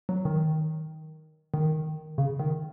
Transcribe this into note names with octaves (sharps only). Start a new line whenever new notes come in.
F#3
D#3
D#3
C#3
D#3